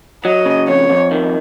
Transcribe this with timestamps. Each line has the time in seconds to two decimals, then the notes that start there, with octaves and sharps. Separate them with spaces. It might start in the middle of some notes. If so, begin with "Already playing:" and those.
0.25 F#3 D#5
0.46 C#3
0.68 F2 C#5
0.90 F2
1.11 D#3